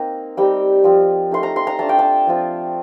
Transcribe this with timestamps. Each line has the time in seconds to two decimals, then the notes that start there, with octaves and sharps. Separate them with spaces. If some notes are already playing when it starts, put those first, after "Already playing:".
Already playing: A#3 C4 D#4
0.37 G3 C4 D#4 G5
0.84 F3 C4 F4
1.31 A3 D#4 C6
1.43 A#5
1.56 C6
1.67 A#5
1.79 A3 D4 F4 A5
1.89 G5
1.99 A5
2.27 F3 C4 F4